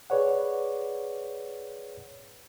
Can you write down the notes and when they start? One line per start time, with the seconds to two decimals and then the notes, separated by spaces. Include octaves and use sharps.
0.10 G#4 B4 C#5 D5 F#5